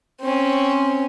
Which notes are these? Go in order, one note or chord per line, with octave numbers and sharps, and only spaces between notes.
C4 C#4